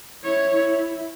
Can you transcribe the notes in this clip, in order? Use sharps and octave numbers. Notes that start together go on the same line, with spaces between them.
E4 C#5
E4